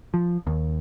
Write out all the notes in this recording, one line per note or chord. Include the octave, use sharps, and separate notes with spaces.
F3
D#2